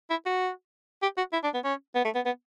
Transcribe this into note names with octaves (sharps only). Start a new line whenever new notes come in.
E4
F#4
G4
F#4
E4
D4
B3
C#4
B3
A3
B3
B3